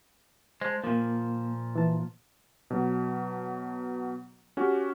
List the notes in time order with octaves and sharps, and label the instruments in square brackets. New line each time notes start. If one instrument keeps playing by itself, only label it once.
[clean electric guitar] G#3 [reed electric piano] C5 A5
[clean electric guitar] A#2 F3 [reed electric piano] A#3
[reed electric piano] E3 A5
[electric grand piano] B2 F#3
C#4 F#4 G4